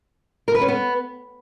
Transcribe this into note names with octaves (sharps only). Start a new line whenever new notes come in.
A#4
B4
C#4
B3